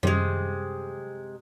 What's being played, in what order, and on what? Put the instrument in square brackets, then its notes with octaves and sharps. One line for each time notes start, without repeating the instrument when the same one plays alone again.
[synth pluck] F#2 D#3 G3 [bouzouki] C3 G#3